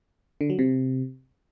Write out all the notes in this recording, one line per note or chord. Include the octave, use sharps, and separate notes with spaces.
D3
F#3
C3